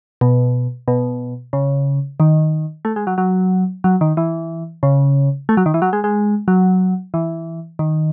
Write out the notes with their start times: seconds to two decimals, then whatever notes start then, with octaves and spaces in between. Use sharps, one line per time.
0.21 B2
0.88 B2
1.53 C#3
2.20 D#3
2.85 A3
2.96 G#3
3.07 F#3
3.18 F#3
3.84 F#3
4.01 D#3
4.17 E3
4.83 C#3
5.49 A3
5.57 F#3
5.66 D#3
5.74 E3
5.82 F#3
5.93 G#3
6.04 G#3
6.48 F#3
7.14 E3
7.79 D#3